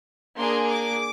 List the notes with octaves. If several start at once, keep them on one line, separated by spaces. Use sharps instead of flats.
A#3 D4 G#4 C6
D6